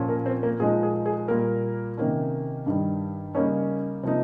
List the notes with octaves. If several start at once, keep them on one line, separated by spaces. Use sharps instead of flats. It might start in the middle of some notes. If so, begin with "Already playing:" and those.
Already playing: A#2 F3 C#4
A#3 A#4
C4 C5
A#3 A#4
A#2 F3 G#3 D#4 G#4
G#4
G#4
A#2 G3 A#3 A#4
C3 D#3 A#3 C#4
G2 D#3 G3
C#3 G3 A#3 C#4 D#4 C#5
C3 F3 A#3 D#4